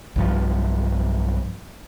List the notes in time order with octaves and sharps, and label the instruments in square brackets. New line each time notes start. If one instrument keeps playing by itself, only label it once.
[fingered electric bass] B1 G2 F3